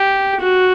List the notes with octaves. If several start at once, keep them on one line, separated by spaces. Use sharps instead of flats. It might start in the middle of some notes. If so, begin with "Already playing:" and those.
Already playing: G4
F#4